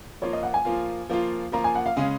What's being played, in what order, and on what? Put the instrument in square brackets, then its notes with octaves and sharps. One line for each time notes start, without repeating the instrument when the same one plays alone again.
[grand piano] F3 A#3 F4 [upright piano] C#5
[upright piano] D#5
F#5
G#5
[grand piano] F3 A#3 F4
F3 A#3 F4
[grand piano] F3 A#3 F4 [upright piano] A#5
[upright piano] G#5
F#5
F5
[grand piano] C#3 G#3 C#4 G#4 [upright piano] F5